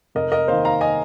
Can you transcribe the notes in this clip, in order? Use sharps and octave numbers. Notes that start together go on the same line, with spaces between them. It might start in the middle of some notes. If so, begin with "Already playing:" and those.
F1 A#4 D#5
A#4 D#5
D#2 D#3 C5 F5
F5 A#5
D#5 G#5